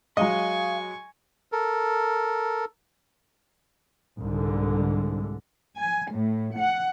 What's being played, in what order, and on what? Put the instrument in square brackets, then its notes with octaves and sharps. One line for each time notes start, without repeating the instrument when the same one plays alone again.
[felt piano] F#3 G#3 [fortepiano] D#5 [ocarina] F5 [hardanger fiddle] G#5 C#6
[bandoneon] A4 A#4
[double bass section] C2 G#2 D3
[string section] G#5
A2
F#5